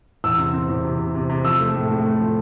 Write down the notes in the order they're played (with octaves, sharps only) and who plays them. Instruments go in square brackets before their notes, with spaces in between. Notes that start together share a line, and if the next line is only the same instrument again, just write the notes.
[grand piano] E2 E6
C3
C4
E2
C3
C3
C3
C3
F3 E6
A3
A2
A2
A3
F3